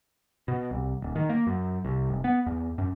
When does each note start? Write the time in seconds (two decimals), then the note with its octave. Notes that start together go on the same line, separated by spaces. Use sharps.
0.48 B2
0.71 C2
1.02 D1
1.16 D#3
1.29 A#3
1.47 F#2
1.85 C2
2.10 F1
2.24 B3
2.46 E2
2.78 F#2